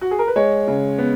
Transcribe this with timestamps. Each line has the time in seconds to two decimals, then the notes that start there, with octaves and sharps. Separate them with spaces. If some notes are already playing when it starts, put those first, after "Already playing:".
0.01 F#4
0.11 G#4
0.19 A#4
0.28 B4
0.36 G#3 C#5
0.68 C#3
0.98 B3